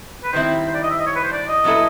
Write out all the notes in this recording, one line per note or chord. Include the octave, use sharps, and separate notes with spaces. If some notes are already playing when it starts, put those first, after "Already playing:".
B4
D#3 G3 C4 E4 C5
C5
D5
D#5
E5
D#5
C#5
B4
C5
D5
D#5
A#2 F#3 B3 E4 A4